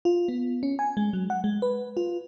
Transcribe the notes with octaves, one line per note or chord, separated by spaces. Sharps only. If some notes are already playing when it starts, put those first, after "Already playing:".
F4
B3
C#4
G#5
G#3
F#3
F#5
G#3
B4
F4